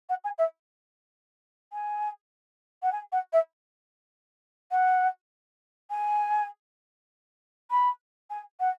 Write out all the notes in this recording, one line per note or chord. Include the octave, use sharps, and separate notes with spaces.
F#5
G#5
E5
G#5
F#5
G#5
F#5
E5
F#5
G#5
B5
G#5
F#5